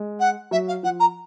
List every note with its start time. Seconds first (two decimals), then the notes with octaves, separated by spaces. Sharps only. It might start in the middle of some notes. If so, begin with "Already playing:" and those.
Already playing: G#3
0.19 F#5
0.51 F#3 E5
0.68 F5
0.83 F3 F#5
1.00 A#5